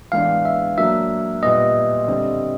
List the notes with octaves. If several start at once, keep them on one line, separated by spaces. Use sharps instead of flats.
E3 G#3 B3 D4 F5
E5
F#3 A#3 D4 E5
A#2 G3 B3 D#5
D3 G3 C4